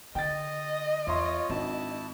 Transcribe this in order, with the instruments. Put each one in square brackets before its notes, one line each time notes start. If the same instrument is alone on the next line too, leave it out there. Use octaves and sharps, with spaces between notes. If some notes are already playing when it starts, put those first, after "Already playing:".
[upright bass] D3 [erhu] D#5 [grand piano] G5 A6
[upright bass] E2 [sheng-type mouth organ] F4 C#5 [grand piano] E5 C6
[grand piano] G#1 [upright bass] D4 [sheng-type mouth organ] E4 A5